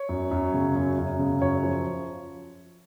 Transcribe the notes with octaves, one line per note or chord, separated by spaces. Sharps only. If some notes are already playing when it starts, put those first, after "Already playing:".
Already playing: C#5
F#2
F#2
C#3
F#2
F#2
C#3
F#2 C#5
F3